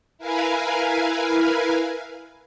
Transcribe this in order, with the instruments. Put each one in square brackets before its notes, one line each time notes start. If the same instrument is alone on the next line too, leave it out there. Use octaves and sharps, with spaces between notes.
[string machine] E4 A#4 B4 F5 G#5